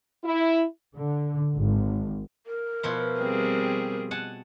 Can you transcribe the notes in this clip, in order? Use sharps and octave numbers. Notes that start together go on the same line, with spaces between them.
E4
D3
G#1
A#4
B2 F3 E4
G3 C4 G#4
F#5 G#5 A5